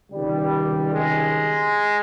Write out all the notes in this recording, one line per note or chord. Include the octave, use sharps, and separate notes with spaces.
C#2 C3 D#3 G3
G#3